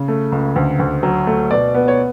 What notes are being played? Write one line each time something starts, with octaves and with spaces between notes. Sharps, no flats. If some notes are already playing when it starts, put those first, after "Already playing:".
Already playing: C#3
A3
C#2
D2
D2
F#3
A3
B2 D5
B3
C#5